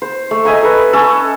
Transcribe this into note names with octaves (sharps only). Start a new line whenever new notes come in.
C5
A3
D#5 E5 G#5 A#5
A4 B4
C#4 A4